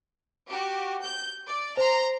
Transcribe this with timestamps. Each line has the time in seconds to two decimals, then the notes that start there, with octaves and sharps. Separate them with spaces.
0.48 F#4 G4
1.01 G6
1.47 D5
1.77 C5 A#5 C6